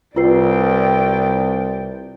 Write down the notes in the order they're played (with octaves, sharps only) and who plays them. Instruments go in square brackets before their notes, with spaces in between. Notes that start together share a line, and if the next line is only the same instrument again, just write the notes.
[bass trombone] C2 [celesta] F4 B4 C7 [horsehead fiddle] D5 G5